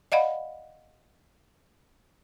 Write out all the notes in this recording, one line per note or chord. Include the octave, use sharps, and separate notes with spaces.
D5 D#5 F5 F#5 B5